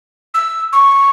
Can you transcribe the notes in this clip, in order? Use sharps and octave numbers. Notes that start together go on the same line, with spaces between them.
E6
C#6